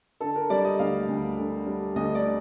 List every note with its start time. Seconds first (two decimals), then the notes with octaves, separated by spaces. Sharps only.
0.20 D3 A4
0.36 A#4
0.50 G3 D5
0.64 D#5
0.79 D2 F5
1.08 D2
1.38 D3
1.66 G3
1.96 D2 D#5
2.15 D5